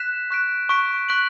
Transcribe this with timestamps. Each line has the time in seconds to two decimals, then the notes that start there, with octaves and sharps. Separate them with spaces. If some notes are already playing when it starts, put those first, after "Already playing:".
Already playing: F#6 B6 E7
0.30 C#6 F#6 B6 D7
0.69 C#6 F#6 B6 D7
1.09 C#6 F#6 B6 D7 F#7